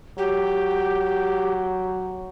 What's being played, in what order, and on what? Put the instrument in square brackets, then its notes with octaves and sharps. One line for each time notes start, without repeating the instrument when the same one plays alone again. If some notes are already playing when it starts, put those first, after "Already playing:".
[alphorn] F#3 [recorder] G4